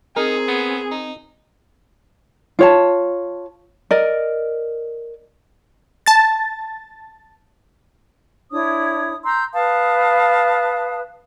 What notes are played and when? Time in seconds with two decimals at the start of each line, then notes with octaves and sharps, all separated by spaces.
0.16 C4 D#4 G#4 A#4
0.48 B3
0.92 D#4
2.59 F4 C#5 A5
3.91 A#4 D5 D#5
6.06 A5 A6
8.52 D4 E4 C#5 D#6
9.25 A#5 C6 E6 G6
9.54 B4 F5 A5 D#6